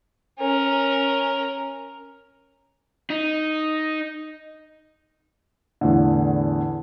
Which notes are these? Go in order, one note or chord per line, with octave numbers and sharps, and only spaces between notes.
C#4 A#4
D#4
E2 A2 D3